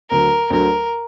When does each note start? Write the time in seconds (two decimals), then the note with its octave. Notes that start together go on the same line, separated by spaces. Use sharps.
0.10 D2 D3 F#3 A#4
0.50 D2 D3 F#3 A#4